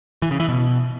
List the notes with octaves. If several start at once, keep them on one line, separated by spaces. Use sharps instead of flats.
E3
C#3
E3
B2